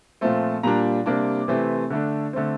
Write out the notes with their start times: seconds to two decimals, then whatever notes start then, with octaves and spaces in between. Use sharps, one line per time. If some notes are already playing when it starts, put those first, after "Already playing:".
0.21 A#2 F3 A3 C4
0.63 A#2 G3 A#3 D4 A#5
1.06 C3 G3 A#3 D4 D6
1.48 C3 E3 A3 C4
1.90 D3 A3 D4
2.33 D3 A3 C4